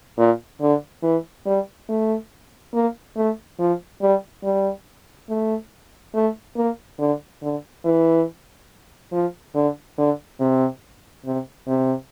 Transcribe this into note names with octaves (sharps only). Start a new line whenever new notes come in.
A#2
D3
E3
G3
A3
A#3
A3
F3
G3
G3
A3
A3
A#3
D3
D3
E3
F3
D3
D3
C3
C3
C3